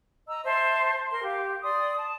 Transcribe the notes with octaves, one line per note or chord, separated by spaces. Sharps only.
D#5 A#5 E6
C5 E5 A5 C6
A#4 C6
G4 F5
D5 C6 D#6
A5